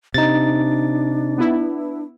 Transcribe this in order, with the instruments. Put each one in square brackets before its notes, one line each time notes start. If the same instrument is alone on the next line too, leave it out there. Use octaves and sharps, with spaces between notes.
[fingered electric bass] C3 [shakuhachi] D4 [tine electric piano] D#4 A6
[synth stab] B3 E4